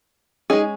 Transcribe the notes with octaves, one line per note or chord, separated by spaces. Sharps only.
G#3 C#4 D#4 G#4